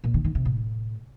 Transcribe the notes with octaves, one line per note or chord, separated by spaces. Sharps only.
A#2
D#3
D#3
C3
A2